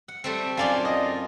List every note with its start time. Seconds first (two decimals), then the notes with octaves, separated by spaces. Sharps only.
0.08 F#5
0.24 G3 A3 C4
0.57 F#2 F4 D5 F5 G#5 C6
0.85 D#5